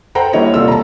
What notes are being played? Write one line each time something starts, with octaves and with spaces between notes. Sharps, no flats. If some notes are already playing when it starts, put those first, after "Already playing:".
A4 C5 F#5 G5 A#5
D#2 G3 E4 C#5 D#5
D#1 C2 F4 A4 E6
A5 A#5